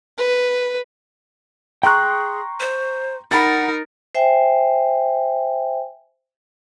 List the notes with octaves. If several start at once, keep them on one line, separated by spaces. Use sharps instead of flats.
B4
G#4 G5 A#5 C6 C#6 F#6
C5
D#4 A#4 F#5 B5 A6
C5 E5 G5 G#5